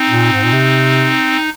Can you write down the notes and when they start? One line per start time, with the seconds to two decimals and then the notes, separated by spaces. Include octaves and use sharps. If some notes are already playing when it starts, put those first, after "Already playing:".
Already playing: C4 D#4
0.08 A#2
0.32 G#2
0.43 A#2
0.52 C3